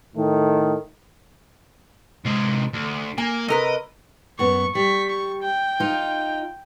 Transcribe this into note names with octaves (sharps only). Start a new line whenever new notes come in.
A2 D#3 A3
C3 G#3
D2
A#3 G#5
C3 A#4 B4 D#5
F#2 B3 C#6
G3 C#6 B6
C#6
G5
D#4 F4